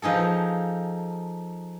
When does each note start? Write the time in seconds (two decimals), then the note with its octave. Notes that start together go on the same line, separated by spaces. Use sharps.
0.02 F3 D#4 G#4 A4